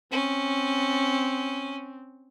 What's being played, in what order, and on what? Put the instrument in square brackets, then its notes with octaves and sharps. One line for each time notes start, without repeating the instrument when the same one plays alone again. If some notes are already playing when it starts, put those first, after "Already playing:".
[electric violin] C4 [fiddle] C#4